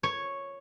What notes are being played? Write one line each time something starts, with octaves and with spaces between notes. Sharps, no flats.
C#5